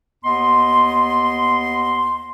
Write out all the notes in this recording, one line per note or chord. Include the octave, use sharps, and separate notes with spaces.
D#2 B3 D#5 C6